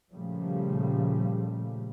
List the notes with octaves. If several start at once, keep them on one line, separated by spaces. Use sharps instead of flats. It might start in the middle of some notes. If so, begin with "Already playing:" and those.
A#2 C#3 F3 G3 A3